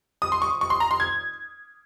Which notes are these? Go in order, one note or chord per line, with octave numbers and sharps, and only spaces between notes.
D#6
C6
C#6
C#6
C6
A#5
C6
G#6